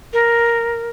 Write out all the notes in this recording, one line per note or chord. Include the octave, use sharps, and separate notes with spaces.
A#4